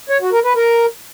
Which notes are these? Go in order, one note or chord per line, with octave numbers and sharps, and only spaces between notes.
C#5
F#4
A#4
B4
A#4